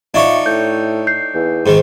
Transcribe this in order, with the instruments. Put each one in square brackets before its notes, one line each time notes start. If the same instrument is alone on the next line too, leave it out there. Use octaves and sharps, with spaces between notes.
[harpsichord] D4 D#4 C#5 [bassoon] F4 [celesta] D#5 E5 C#6
[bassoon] A2 [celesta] G6
[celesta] G6 C7
[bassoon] E2
[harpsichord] G#2 D#3 [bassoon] C4